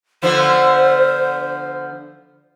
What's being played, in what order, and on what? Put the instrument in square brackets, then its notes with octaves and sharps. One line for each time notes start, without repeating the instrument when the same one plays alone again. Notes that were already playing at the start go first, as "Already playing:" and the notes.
[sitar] D3 F3 B3 [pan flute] C5